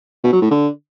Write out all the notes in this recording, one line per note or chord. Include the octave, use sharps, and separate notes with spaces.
B2
F#3
A2
D3